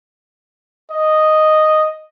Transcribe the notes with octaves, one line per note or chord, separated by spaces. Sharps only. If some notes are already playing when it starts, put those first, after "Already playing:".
D#5